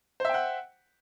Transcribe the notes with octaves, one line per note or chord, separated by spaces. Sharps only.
C5 E5 F#5 G5